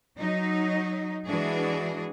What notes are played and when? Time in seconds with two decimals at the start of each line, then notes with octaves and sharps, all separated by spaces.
0.18 F#3 D#4
1.26 E3 G#3 D4 F#4 G#4